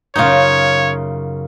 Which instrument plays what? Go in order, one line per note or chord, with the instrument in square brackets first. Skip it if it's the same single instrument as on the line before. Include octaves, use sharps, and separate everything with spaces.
[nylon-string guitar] F#2 A2 C#3 [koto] D#4 F4 [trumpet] C#5 [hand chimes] F5 G6